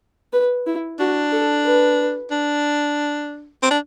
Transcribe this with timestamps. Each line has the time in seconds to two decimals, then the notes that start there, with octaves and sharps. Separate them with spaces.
0.33 B4
0.66 E4
0.99 D4 F#4
1.32 A4
1.65 B4
2.31 D4
3.63 C4
3.71 D4